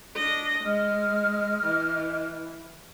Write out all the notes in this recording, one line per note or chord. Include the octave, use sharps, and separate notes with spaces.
D4 D#5
G#3 D#5 F6
E3